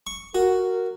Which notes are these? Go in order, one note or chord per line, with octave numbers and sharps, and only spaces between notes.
C#6
F#4 A#4